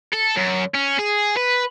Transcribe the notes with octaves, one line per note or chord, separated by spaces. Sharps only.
A4
F#2
C#4
G#4
B4